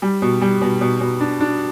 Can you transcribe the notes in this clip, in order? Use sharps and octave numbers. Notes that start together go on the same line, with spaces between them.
G3
B2
G3
B2
B2
B2
D4
D4